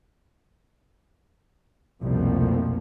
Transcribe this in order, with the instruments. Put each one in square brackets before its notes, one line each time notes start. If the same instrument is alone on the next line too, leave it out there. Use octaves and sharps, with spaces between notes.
[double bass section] C2 F2 B2 F3 A3 A#3